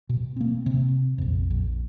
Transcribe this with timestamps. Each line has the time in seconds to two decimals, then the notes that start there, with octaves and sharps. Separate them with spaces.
0.09 B2
0.36 A#3 C4
0.66 C3 C4
1.18 A#1 F2
1.50 A#1